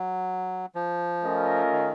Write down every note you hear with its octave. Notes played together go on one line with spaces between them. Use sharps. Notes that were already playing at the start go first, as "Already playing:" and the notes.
Already playing: F#3
F3
A3 C#4 F4 A#4 D#5
D#3